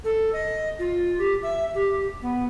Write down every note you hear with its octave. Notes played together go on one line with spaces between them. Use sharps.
A4
D#5
F4
G4
E5
G4
B3